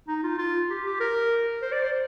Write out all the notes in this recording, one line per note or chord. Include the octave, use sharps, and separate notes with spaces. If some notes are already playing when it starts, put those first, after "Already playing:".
D#4
F4
F4
G4
G4
A#4
C5
D5
C5